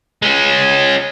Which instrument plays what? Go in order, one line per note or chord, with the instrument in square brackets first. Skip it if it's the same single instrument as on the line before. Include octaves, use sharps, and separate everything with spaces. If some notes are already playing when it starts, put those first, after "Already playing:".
[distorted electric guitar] G#3 C#4